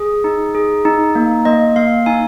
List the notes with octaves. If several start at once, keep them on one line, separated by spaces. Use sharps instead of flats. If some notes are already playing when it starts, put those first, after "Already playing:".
Already playing: G#4
D#4
G#4
D#4
A#3
A#3 D#5
A#3 F5
D#4 G#5